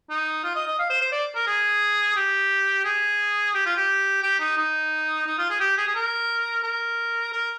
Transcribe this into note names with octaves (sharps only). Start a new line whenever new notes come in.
D#4
F4
D#5
D#5
F5
C5
C5
D5
A#4
G#4
G4
G#4
G4
F4
G4
G4
D#4
D#4
D#4
F4
G#4
G4
G#4
G#4
A#4
A#4
A#4